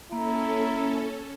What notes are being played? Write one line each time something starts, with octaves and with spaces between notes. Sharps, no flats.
A#3 C#4 E4 A4 A#5